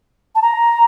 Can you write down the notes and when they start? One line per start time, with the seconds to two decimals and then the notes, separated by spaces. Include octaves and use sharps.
0.35 A5
0.42 A#5